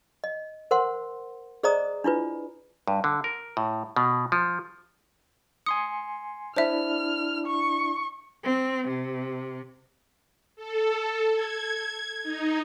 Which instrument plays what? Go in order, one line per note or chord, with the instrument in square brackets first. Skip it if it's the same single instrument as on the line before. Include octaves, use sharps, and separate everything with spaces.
[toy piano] D#5
A#4 C5 F#5 C6
G#4 C5 D5 D#5 A#5 D#6
D4 E4 F4 B4
[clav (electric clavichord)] G2
D3
A#4
A2
B2
F3
[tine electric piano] G#5 C6 C#7 [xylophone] D#6
[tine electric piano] D4 E4 [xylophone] C5 E5 [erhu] F6
[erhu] C#6
[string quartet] C4
C3
[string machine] A4
G#6
D#4